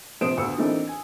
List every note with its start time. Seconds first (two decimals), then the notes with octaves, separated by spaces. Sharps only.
0.21 A#1 C3 C5 D#6 D7 E7
0.37 D2 B3 F5 E6 C#7
0.58 E3 A#3 C4 D4 D#4 A4
0.87 G#5